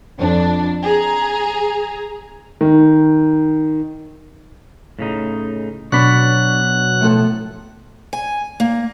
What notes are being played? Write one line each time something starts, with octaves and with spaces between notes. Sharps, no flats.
F2 D4
G#4 A#5
D#3
A2 C#3 D#4
B2 F#3 D4 C#5 D5 B5 F#6
A2 F3 A4
G#5
A#3